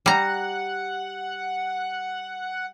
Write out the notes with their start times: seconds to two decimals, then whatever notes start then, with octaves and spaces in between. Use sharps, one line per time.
0.06 G3 F#5 A#5